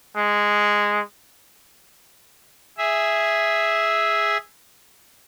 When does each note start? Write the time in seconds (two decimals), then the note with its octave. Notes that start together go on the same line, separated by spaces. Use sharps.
0.16 G#3
2.78 G#4 E5